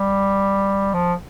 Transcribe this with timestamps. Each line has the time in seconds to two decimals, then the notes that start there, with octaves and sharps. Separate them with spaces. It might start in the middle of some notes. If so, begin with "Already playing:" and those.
Already playing: G3
0.93 F3